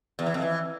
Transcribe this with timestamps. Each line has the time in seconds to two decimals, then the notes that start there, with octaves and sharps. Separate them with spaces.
0.19 E2
0.26 E3
0.34 F2
0.42 E3